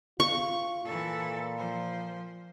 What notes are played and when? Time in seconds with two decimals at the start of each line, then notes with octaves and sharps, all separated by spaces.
0.20 F4 C#6
0.85 A#2 E3 A4
1.57 F3 C5